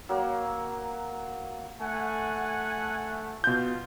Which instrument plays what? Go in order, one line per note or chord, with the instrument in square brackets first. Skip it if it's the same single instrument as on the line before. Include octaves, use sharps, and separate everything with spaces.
[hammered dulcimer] F#3 A#3
[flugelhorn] A3 [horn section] F#5 G#5
[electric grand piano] B2 G6 [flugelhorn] F4